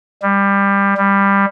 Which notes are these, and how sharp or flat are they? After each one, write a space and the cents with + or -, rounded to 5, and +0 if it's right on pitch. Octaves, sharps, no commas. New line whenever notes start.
G3 +20
G3 +15